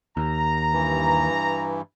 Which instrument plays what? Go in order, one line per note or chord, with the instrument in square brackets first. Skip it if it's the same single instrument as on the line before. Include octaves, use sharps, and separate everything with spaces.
[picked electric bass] D#2 [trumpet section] A#5
[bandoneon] G2 E3